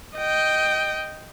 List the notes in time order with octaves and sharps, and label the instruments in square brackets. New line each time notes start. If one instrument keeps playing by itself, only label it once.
[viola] D#5 G5